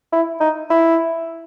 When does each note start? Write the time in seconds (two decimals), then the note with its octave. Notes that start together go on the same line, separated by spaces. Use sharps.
0.12 E4
0.40 D#4
0.70 E4